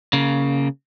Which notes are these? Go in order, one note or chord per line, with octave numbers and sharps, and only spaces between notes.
C#3 A#3